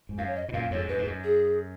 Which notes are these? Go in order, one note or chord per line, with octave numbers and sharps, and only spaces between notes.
G#2
F#2 F5
C#5
D#5
B2
F#2 A#2 F5
F2 G#2 C#5
F#2 B4
G#2
F#2
G#4